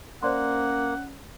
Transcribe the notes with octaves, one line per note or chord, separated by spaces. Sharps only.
A#3 C#4 C5 D5 F#5 C6